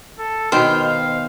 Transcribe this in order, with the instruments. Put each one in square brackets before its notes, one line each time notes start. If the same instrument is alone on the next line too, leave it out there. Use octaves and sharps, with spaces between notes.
[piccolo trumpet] A4
[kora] B2 D#3 [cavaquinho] C5 G5 [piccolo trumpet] F6
[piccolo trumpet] F5